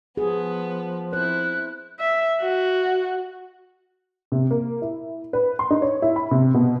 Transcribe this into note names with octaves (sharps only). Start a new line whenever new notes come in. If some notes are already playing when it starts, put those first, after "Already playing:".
F3 B3 G#4
E4 C5 F#6
E5
F#4
C3
A#3
E4
B4
C6
D#4
C#5
E4
B5
C3
B2